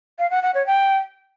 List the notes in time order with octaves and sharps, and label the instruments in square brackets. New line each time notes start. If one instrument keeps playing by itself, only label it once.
[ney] F5
F#5
F#5
C#5
G5